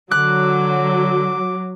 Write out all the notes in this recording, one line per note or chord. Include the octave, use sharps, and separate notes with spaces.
D3 F#3 D6 F#6